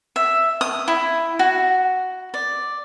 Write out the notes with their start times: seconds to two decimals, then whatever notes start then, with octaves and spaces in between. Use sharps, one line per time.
0.16 E5
0.61 D#6
0.88 E4
1.39 F#4
2.34 D5